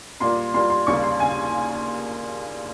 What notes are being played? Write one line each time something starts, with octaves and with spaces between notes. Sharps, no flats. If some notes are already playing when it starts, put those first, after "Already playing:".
A#2 G3 A#3 C6
A#2 G3 A#3 C6
C6
D#2 C#3 G3 A#3 C#6
C6
C#3 G#5